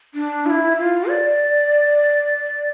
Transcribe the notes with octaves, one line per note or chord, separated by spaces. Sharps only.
D4
F4
E4
F4
D5